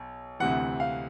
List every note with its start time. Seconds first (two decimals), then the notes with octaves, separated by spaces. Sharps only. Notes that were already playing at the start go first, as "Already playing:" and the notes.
Already playing: B1
0.40 D2 C3 E3 F#5
0.80 F5